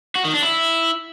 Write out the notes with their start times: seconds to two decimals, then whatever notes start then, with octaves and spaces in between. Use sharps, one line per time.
0.16 F#4
0.25 D#3
0.34 D4
0.43 E4